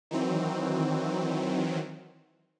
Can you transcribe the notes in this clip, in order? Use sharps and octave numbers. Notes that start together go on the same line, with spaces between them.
D#3 E3 F#3 C4